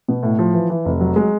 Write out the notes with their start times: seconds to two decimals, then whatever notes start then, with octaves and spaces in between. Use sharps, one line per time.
0.08 B2
0.23 A2
0.39 F3
0.54 E3
0.70 E3
0.85 F1
1.01 F#3
1.16 G#3